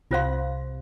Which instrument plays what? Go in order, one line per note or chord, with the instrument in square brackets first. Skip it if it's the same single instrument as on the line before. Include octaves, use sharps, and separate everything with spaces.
[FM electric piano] C2 C3 [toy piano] F4 C5 F5 C6